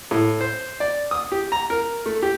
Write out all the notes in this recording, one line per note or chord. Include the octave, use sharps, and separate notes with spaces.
A2
C5
D5
D#6
G4
A#5
A#4
A3
G4